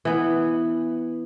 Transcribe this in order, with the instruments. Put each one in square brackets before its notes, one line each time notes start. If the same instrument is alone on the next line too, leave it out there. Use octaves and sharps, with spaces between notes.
[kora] E3 B3